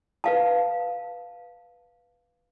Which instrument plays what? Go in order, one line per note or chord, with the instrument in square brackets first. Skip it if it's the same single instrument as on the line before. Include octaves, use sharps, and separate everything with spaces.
[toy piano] B4 F5 A5